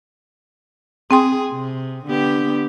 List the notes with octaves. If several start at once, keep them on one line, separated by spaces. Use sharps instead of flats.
C4 G#4 G5 C6
C3
D3 B3 G4